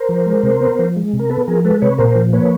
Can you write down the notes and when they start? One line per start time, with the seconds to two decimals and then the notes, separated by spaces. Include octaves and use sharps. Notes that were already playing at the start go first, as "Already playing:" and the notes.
Already playing: A#4 C5
0.09 F3
0.26 G#3
0.43 C3
0.60 B3
0.79 F3
0.96 G#3
1.13 C3
1.19 A#4
1.29 B3 A4 B4
1.48 F3 G#4 A#4
1.64 G#3 A4 B4
1.82 C3 B4 C#5
1.98 A#2 A#4 C5
2.16 F3
2.33 A#3 B4 C#5